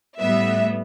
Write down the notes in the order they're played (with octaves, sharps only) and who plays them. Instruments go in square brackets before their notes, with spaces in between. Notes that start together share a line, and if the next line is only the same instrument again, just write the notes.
[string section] A2 G3 B3 E5